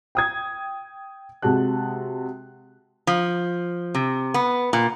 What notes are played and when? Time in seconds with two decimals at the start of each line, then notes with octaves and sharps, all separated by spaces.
0.15 G5 D#6 G#6
1.42 C3 G#3 F#4 A5 F#6
3.07 F3
3.95 C3
4.34 B3
4.73 A#2